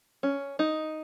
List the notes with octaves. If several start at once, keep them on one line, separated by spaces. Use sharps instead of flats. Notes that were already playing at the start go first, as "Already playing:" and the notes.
C#4
D#4